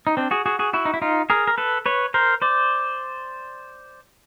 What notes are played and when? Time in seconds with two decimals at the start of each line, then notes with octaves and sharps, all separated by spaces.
0.07 D#4
0.17 C4 D4
0.31 F#4 G#4
0.46 F#4 G#4
0.59 F#4 G#4
0.73 E4 F#4
0.85 D#4
0.94 E4
1.02 D#4 F4
1.30 G#4 A#4
1.47 A#4
1.58 A4 B4
1.86 B4 C#5
2.14 A#4 C5
2.42 C5 D5